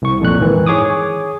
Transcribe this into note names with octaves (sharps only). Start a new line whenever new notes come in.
C2 C#6
F2 A#2 F#6
G#2 D#3 E3
G#4 C#5 D6 D#6